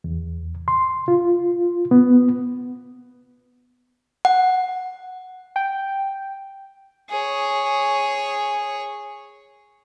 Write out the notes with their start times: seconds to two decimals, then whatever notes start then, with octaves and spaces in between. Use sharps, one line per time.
0.04 E2
0.68 C6
1.08 F4
1.91 B3
4.25 F#5
5.56 G5
7.10 G#4 C#5